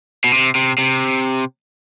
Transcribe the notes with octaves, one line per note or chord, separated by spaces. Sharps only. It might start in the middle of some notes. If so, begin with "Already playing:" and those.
B2
C3
C3
C3